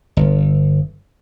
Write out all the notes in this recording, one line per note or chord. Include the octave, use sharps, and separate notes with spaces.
G1